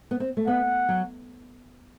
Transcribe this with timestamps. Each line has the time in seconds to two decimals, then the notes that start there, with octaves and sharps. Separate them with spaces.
0.11 B3
0.20 C4
0.37 A3
0.47 B3 F#5
0.89 F#3